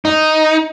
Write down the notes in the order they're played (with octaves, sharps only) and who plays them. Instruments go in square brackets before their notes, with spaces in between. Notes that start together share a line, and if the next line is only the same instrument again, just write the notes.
[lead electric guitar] D#4